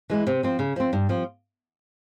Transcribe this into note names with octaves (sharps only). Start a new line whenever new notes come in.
E3 G#3 E4
C3
F3 C4
C#3
F3 C4
G2
F3 C4